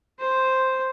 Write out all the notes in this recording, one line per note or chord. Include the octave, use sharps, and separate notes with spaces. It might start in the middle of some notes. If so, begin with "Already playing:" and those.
C5